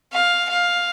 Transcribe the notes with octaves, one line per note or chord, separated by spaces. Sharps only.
F5
F5